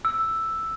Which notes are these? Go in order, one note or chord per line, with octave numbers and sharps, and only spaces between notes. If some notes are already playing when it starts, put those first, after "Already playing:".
E6